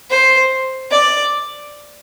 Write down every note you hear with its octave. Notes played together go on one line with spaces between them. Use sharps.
C5
D5